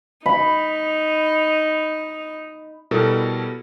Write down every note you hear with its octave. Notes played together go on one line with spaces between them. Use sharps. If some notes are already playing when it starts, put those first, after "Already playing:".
D#4 B5
B2 G3 E4 A4 A#4